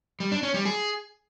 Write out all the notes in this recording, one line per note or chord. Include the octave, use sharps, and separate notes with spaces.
G3
D4
C#4
G3
G#4